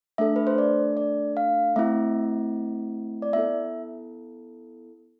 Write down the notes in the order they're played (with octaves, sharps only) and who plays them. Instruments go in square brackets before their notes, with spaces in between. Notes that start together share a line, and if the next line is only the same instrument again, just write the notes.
[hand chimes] A3 D4 A4 E5
B4
C5
D5
D5
F5
A3 C4 E4 E5
D5
B3 E4 A4 E5